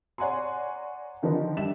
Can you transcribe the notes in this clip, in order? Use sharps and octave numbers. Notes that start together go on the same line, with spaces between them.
C#5 D5 F#5 G#5 A#5 C6
D3 D#3 F3 D4 D#4 B4
G3 D4 E5 E7